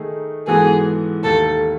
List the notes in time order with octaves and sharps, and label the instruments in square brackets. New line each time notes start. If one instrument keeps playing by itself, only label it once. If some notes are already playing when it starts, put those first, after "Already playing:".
Already playing: [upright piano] D#3 A3 D#4 G#4
[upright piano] G#2 E3 B3 F#4 A4 [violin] G#4
[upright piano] D#2 D#3 A3 [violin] A4